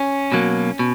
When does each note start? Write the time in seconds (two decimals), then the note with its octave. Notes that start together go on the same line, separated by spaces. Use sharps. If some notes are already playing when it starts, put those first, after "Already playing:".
Already playing: C#4
0.32 B2 F#3 A#3
0.79 B2